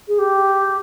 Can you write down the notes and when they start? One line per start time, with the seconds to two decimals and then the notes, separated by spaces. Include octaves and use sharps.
0.08 G#4
0.19 G4